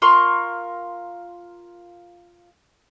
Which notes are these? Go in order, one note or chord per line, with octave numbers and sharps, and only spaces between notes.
F4 A#4 C6 C#6